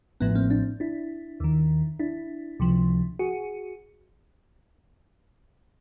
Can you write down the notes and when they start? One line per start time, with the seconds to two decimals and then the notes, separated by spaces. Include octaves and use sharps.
0.20 A1 A2 F3 B3
0.35 A#3 C4
0.50 C4 D4
0.80 D4 E4
1.40 D#2 D#3
1.99 D4 E4
2.60 C#2 C3 F3
3.19 F#4 G#4